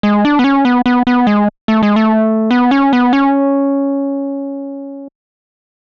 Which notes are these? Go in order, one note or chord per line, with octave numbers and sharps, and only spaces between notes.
G#3
D4
B3
C#4
B3
B3
B3
G#3
A3
G#3
A3
B3
C#4
B3
C#4